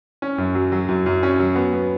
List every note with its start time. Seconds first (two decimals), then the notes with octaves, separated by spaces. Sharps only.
0.22 C#4
0.38 F#2
0.55 F#3
0.72 F#3
0.88 F#2
1.06 F#2
1.23 C#4
1.39 F#3
1.56 B3
1.73 B3